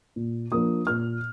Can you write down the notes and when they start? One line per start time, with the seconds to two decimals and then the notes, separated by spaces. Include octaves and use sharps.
0.16 A#2
0.52 F3 A#3 D4 D#6
0.87 A#2 F6